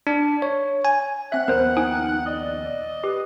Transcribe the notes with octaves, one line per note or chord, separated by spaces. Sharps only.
D4
C#5
G#5
C4 E5 F#5 F#6
A#1 D#2 B3 A#4 C5
D#4 G5 G#5 D#6
D5 D#5
G4 B4